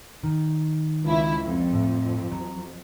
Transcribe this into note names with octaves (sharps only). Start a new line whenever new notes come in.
D#3
C#2 E4
F2
A2
F#3